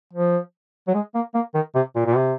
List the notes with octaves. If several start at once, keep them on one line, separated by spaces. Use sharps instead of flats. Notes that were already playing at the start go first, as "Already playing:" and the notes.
F3
F#3
G#3
A#3
A#3
D#3
C3
A#2
A#2
C3